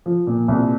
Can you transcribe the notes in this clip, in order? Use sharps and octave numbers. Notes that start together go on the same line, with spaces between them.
F3
A#2
C2